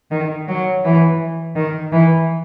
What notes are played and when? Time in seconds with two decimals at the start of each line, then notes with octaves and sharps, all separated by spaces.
0.11 D#3
0.48 F#3
0.84 E3
1.56 D#3
1.92 E3